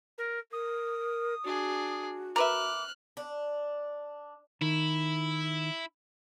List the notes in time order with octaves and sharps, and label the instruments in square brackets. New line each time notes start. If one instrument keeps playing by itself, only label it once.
[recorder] A#4
[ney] A#4 [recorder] D#6
[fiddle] D4 G#4 [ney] F#4
[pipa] A#4 B4 E5 [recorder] D6 [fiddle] F6 F#6
[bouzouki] D4
[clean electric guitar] D#3 [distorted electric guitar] E4